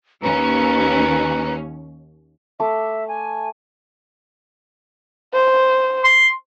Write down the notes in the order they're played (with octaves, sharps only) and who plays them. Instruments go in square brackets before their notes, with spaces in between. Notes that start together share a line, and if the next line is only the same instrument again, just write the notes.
[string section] D#2 C#4 [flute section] B4 A#5
[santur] A3 C6 D6 [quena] E5
[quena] G#5
[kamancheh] C5
[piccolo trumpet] C6